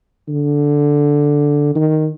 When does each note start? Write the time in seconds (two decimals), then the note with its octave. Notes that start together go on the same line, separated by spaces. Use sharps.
0.29 D3
1.75 D#3